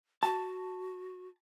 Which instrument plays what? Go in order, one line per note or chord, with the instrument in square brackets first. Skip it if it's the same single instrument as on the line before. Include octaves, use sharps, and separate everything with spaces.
[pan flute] F#4 [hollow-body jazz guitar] A5